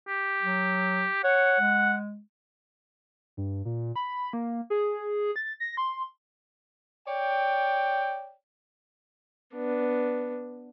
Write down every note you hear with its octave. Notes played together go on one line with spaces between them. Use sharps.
G4
F#3
C#5 F#5
G#3
G2
A#2
B5
A#3
G#4
A6
A#6
C6
C#5 D5 G5
B3 D4